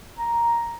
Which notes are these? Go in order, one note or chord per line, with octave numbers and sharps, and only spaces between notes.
A#5